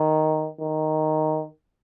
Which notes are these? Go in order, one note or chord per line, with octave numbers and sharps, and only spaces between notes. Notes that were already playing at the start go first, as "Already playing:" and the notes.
Already playing: D#3
D#3